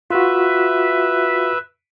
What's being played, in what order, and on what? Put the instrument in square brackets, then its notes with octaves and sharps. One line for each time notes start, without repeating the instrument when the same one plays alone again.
[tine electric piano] F4 F#4 [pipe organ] B4 E5